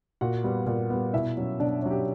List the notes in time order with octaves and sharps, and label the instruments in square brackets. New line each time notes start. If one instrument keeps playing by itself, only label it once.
[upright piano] A#2 F#4 F#5
G3 B3
A#2
G3 B3
B2 E4 E5
F#3 C#4
B2 D4 D5
F#3 C#4
G4